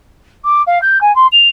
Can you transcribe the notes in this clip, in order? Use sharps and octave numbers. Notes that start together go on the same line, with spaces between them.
D6
F5
G6
G#5
C6
F7